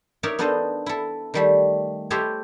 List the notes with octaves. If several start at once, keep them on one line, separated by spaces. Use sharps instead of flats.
D#4 A#4 C#5 D5 E5
B3 D4 D#4 A4 C5 D#5
E4 A4
D#3 G3 A3
E4 G4 A4 C5 C#5 D#5